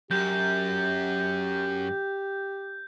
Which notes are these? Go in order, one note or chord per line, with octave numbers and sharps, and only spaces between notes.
F#2 G4 G6